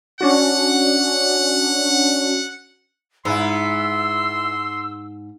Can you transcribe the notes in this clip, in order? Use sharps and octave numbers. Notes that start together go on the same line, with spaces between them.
C#4 D4 F#4 F#5
G#2 B3 E4 C6 E6